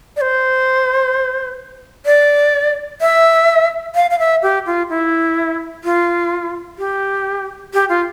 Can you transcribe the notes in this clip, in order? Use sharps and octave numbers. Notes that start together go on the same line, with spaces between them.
D5
C5
D5
E5
F5
F5
E5
G4
F4
E4
F4
G4
G4
F4